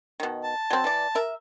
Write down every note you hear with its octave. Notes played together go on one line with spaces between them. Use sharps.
B2 D#3
A5
F#3 C4
E3 D5
A#4 E5